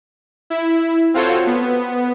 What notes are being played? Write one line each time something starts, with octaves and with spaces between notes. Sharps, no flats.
E4
C4 F4 F#4 A4 C5 C#5
B3